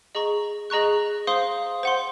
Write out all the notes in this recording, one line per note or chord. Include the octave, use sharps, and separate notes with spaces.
G#4 D#5 A#5 C#6
G#4 D#5 A#5 C#6 F#6
C5 F5 C6 D#6
C5 F#5 C6